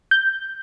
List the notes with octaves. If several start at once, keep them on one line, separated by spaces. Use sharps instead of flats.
G6